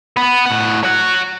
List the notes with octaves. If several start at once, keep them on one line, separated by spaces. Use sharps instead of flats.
B3
A2 F#5
C#5 F#5